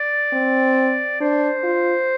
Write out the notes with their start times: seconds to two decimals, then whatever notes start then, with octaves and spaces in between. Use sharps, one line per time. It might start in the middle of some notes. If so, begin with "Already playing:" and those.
Already playing: D5
0.33 C4
1.21 D4 C5
1.64 F4